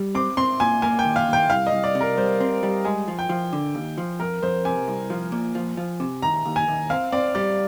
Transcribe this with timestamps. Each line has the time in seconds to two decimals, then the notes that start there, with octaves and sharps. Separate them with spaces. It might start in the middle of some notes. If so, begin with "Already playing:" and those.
Already playing: G3
0.15 C4 D6
0.37 C4 C6
0.60 A#2 G#5
0.82 A#3 G#5
0.99 G5
1.05 D#2
1.16 F5
1.28 D#2
1.33 G5
1.50 C2 F5
1.67 D#5
1.72 C2
1.84 D5
1.95 C3
2.01 A#4
2.17 G3 C5
2.40 C4
2.63 G3
2.85 G#3 G#5
3.08 F3
3.19 G5
3.29 F3
3.53 D3
3.75 D#2
3.98 F3
4.20 F2 A#4
4.42 F2 C5
4.65 C3 G#5
4.88 C2
5.10 F3
5.32 A#2
5.55 F3
5.77 F3
6.00 C3
6.22 D#2 A#5
6.46 D#2
6.56 G#5
6.68 D#2
6.90 C4 F5
7.12 C4 D5
7.35 G3 D5